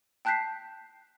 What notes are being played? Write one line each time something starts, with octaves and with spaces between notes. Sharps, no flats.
G5 A5 F#6 G6 B6 C7